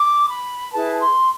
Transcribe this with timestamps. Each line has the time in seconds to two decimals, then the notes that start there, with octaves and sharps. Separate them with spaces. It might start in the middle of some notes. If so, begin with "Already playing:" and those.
Already playing: D6
0.29 B5
0.72 E4 G#4 B4 A5
1.01 C6